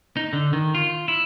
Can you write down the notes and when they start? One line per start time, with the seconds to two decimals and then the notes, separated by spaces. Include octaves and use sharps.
0.17 D#4
0.33 D3
0.53 D#3
0.75 F4
1.08 E4